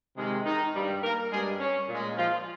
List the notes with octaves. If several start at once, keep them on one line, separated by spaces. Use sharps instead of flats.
C3 D#3 G#3
D#3 D#4
G2 G3
A#3 A#4
G2 G3 G#3 G#4
C#4
A#2 G#3
F3 F4